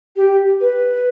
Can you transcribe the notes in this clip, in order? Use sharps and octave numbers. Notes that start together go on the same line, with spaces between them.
G4
B4